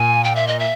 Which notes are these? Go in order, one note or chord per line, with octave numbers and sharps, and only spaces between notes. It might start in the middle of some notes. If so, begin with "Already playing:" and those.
Already playing: A#2 G#5
G5
E5
D#5
E5